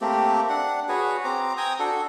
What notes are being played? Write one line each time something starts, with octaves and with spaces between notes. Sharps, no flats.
A3 A#3 C4 G4
D4 F#5
F#4 G#4 B4 C#5
C4 C5 A#5 D6
G5 G#5 A#5 D#6
D4 F#4 A4